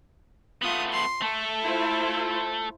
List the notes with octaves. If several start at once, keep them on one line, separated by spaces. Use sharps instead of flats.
A3 B3 F4 D#6
C6
A3 A4
E4 F4 C5